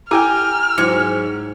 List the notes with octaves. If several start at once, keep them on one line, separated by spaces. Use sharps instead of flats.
E4 G4 A4 G5 G#5 A#5 F6
G#2 F#3 E4 G#6 C#7